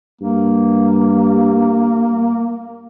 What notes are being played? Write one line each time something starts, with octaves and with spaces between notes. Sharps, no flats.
G2 A#3